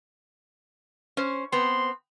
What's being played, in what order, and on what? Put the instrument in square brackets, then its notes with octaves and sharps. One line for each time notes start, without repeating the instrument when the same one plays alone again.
[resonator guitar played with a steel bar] C#4 C5
[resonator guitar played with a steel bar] B3 C4 [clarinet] C6